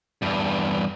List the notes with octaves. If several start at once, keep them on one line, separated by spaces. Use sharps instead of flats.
E2 G2